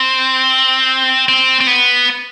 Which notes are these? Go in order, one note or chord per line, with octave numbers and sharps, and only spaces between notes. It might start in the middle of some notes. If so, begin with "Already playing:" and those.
Already playing: C4
C4
C4
B3